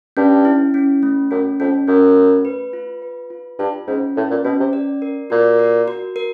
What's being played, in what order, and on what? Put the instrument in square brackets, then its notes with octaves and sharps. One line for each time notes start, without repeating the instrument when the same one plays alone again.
[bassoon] G2 [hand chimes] C#4
[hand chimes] E4
C#4
A3
[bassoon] F#2 [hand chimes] C#4
[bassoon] F2 [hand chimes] C#4
[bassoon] F#2 [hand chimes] C#4
[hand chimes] A3
B4
F4
B4
F4
[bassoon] G2 [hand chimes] F4
[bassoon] G#2 [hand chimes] C#4
[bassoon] A2 [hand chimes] B4
[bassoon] A#2
[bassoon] B2 [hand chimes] C#4
[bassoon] C3
[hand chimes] D5
A#4
[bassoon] A#2 [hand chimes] F#4
[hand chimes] A#4
F#4
A#4